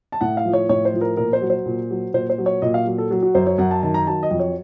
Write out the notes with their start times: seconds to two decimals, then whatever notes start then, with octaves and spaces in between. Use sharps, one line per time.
0.12 A5
0.21 A2 F#5
0.37 F5
0.45 F3
0.53 C#5
0.69 A2 C#5
0.85 C5
0.94 F3
1.01 A#4
1.17 A#2 A#4
1.33 C5
1.41 F#3
1.50 C5
1.66 A#2
1.90 F#3
2.14 A#2 C5
2.30 C5
2.38 F#3
2.46 C#5
2.62 A#2 D#5
2.74 F5
2.86 F#3
2.98 A4
3.11 F#3
3.23 F#4
3.35 F#2 C5
3.47 C#5
3.58 F#2 F#5
3.71 A5
3.83 D#3 A5
3.94 A#5
4.07 F#3 A5
4.23 D#5
4.31 F2
4.40 C#5